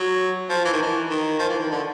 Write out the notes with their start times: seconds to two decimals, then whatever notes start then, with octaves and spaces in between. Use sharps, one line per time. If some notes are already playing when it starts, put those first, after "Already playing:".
Already playing: F#3
0.49 F3
0.65 E3
0.73 D#3
0.82 E3
1.10 D#3
1.39 F3
1.49 E3
1.59 D#3
1.71 D3